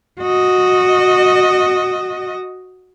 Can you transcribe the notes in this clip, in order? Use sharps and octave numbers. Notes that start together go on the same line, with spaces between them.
F#4 D#5